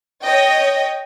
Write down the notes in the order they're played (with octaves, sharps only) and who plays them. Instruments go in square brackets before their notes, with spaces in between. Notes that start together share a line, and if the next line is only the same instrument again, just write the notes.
[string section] C#5 D#5 G5